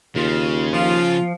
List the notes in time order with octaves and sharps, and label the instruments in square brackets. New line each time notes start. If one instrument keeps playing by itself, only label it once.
[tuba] D#2 [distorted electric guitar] C#3 [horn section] F4
[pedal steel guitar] F3 [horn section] F4